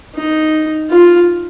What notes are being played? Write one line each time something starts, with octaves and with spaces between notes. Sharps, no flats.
D#4
F4